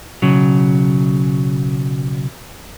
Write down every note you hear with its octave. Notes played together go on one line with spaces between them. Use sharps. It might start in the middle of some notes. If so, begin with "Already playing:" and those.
B1 C#3 F#3